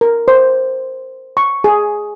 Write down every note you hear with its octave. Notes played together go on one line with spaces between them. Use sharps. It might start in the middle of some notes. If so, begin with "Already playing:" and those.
A#4
C5
C#6
G#4